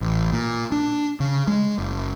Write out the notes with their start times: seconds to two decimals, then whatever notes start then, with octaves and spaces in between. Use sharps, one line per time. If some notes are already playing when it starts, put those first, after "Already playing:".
0.01 A1
0.33 A#2
0.72 D4
1.20 C#3
1.48 G#3
1.78 F#1